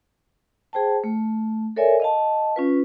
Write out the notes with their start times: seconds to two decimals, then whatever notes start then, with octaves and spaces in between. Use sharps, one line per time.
0.73 G#4 C5 G5 A5
1.04 A3
1.76 A4 A#4 C#5 D5 E5 G#5
2.00 D#5 F5 A5
2.56 C#4 F4 B4